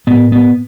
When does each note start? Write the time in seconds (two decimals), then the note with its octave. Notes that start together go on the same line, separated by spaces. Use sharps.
0.07 A2 B3
0.32 B3